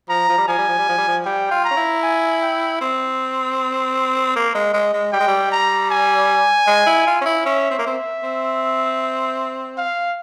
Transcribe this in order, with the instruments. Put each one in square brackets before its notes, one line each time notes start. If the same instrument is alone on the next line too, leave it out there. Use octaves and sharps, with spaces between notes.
[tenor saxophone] F3 [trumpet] A#5
[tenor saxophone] F3
G3
[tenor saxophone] F3 [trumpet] G#5
[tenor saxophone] G3
F3
G3
F3
G3
F3
[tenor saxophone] G3 [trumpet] G5
[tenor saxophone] F4
[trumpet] A#5
[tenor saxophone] C#4
E4
[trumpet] G#5
G5
[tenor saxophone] C4
A#3
G#3
G#3
G#3
[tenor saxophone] G3 [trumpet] G5
[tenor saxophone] G#3
G3
[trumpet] A#5
G#5
[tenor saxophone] G#3
E4
F4
C#4
E4
[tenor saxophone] C#4 [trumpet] E5
[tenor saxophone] C4
A#3
[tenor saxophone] C4 [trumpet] E5
[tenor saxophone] C4
[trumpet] F5